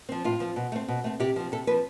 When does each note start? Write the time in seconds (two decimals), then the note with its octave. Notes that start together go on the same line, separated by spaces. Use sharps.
0.09 F3 C4
0.24 A2 F4
0.40 F3 C4
0.56 B2
0.72 A3 C4
0.88 B2
1.04 A3 C4
1.20 C3 G4
1.36 F3 C4
1.52 C3 A4
1.67 F3 C4 B4